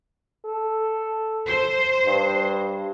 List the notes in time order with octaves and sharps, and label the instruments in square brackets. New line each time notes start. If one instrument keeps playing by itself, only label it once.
[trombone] A4
[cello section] C5
[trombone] G2